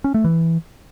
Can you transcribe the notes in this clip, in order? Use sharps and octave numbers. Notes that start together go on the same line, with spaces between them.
C#4
A3
E3